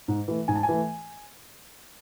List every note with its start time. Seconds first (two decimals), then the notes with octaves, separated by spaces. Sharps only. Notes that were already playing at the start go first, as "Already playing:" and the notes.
0.08 G#2
0.28 E3 A3
0.48 G#2 G#5
0.55 A5
0.63 G#5
0.69 E3 A3